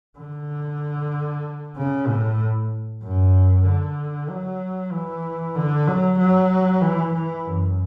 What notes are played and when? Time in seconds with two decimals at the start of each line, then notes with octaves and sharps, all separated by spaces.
0.18 D3
1.77 C#3
2.08 A2
3.03 F#2
3.66 D3
4.30 F#3
4.92 E3
5.56 D3
5.88 F#3
6.19 F#3
6.82 E3
7.14 E3
7.45 F#2